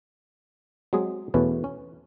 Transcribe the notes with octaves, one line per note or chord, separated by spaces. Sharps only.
F#3 G#3 C4 G#4 D#5
E2 B2 A3 C#4 B4
C#4